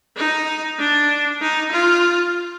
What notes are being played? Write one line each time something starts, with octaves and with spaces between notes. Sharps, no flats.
D#4
D4
D#4
F4